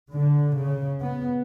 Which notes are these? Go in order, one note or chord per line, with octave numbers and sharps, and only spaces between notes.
D3
C#3
B3